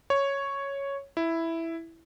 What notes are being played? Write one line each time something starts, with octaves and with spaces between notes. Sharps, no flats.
C#5
E4